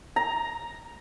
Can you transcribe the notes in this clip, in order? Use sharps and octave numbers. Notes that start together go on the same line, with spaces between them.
A#5